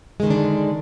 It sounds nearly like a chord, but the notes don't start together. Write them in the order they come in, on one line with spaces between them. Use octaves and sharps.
G#3 D#3 D3 D4